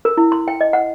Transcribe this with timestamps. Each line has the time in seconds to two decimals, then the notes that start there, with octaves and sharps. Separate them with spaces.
0.05 A#4
0.17 E4
0.32 C6
0.48 G5
0.61 D#5
0.73 F#5